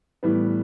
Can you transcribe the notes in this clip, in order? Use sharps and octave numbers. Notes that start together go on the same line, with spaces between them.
A2 E3 G3 B3